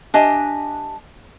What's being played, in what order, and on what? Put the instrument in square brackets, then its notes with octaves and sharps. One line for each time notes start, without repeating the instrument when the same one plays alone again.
[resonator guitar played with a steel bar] D4 G4 D#5 E5 G#5